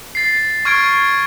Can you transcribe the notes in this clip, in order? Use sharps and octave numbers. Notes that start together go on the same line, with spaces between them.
A6 C7
C#6 F6 G#6 D7